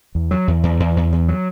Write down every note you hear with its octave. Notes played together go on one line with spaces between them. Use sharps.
E2
F#3
E2
E2
E2
E2
E2
F#3